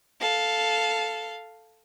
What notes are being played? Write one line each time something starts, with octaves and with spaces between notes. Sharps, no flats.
A4 F5